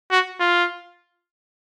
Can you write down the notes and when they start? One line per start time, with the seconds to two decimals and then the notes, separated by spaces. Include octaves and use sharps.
0.11 F#4
0.40 F4